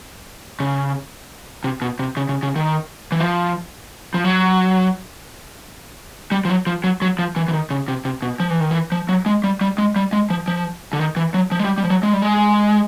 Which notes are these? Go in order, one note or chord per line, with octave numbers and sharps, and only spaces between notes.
C#3
C3
B2
C3
C#3
C#3
C#3
D#3
E3
F3
F3
F#3
G3
F3
F#3
F3
F#3
F#3
F3
E3
E3
D#3
C#3
C3
C3
B2
F3
E3
D#3
E3
F3
F#3
G#3
G3
G3
G#3
G3
G#3
F3
F3
D3
D#3
E3
F#3
F3
G#3
G3
G3
F3
F#3
G#3
G3
G#3